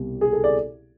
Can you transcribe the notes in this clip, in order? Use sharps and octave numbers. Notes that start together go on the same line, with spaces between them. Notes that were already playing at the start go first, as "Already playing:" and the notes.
Already playing: C2 B2 G3
G#4
A4
D5